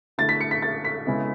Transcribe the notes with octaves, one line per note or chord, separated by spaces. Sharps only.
D3 A3 E4 A6
B6
C#7
B6
A6
B6
C#3 G#3 B3 E4